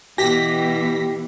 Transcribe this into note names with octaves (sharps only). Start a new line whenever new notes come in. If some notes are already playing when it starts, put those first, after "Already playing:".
B2 E3 G4 A#6 B6